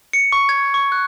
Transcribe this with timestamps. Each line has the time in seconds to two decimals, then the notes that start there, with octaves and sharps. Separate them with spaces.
0.13 C#7
0.32 C#6
0.49 G#6
0.74 C#6
0.92 F#6